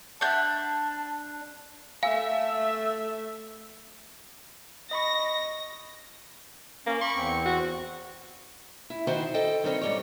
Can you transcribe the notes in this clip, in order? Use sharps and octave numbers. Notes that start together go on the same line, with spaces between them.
D4 E5 F#5 A5 G6
A5
A3 E5 F5 G#5
D#5 B5 C#6 A#6
A#3 C#4
B5 C#6 D6
E2 C4
F#4
E4
D#3 D#4 E4 F#4 C5
A4 D#5 G5
G2 D#3 C4 C#4 C#5
G#2 G3 C#5